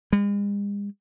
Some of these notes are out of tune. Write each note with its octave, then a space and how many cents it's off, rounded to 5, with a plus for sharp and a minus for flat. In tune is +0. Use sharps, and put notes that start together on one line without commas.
G#3 -45